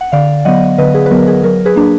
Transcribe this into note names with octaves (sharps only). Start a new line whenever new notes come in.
F#5
D3 D5 F5
F#3 B3 D#5 F#5
D3 B4 D#5
G#4 B4
B4
F#3 B3 A#4
G#4
F#3 A#4
G#4 B4
A#3 D4